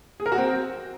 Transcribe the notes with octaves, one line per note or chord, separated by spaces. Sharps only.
G#4
A#4
F#4
C4